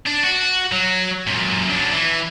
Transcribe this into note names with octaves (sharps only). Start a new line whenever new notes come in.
D4
F#4
F#3
F#2 A#2
F#3 D4
E3